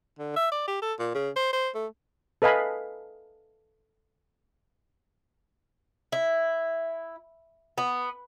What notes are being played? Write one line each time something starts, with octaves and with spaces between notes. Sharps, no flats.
D3
E5
D5
G4
A4
A#2
C#3
C5
C5
A3
A4 B4 D#5 F5 G#5 B5
E4
B3